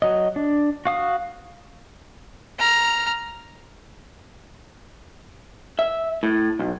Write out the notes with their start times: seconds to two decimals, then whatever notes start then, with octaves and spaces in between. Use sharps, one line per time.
0.02 F#3 D#5
0.36 D4
0.85 F#4 F5 D#6
2.59 A#5 F6
5.79 E5
6.23 A2
6.59 B1